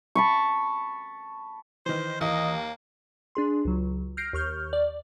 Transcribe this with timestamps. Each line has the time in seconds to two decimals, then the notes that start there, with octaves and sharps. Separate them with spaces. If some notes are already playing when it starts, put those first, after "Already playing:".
0.15 A5 B5 C#6
1.86 D#3 E3 C5
2.21 D#2 E3 A#3 D#5
3.35 D4 G#4 C6
3.65 C#2 F#3
4.17 F6 G6 A#6 C7 D7
4.33 D#2 C#6 F6 G6
4.73 D5